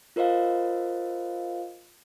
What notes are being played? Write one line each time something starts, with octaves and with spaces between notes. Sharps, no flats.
F4 A#4 C5 D#5 F5